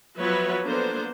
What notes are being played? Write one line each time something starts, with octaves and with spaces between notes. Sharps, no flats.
F3 F#3 B3 B4 C#5 E5
A#3 B3 D4 A4 C5